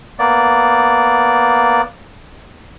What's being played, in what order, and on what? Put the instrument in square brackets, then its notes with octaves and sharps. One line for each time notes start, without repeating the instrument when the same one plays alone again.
[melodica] A#3 B3 D5